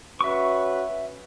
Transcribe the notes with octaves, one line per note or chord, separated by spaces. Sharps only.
C#4 F#4 B4 E5 C#6